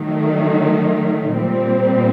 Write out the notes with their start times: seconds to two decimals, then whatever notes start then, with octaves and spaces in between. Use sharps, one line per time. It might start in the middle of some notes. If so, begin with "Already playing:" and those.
Already playing: D#3 F#3 A3
1.38 A#2 G3 C4